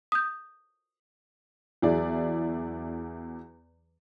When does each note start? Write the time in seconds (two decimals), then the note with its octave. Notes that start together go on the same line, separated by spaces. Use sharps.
0.12 D#6 G6
1.82 E2 F#3 E4 G#4 D5